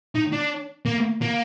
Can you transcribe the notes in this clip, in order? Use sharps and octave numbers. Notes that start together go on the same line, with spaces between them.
D#4
D4
A#3
A#3